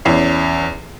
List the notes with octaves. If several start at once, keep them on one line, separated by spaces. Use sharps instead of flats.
E2 C#4 E4 C7